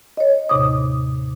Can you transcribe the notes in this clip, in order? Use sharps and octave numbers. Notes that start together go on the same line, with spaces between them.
C#5 D#5
D#2 A2 C3 D6 D#6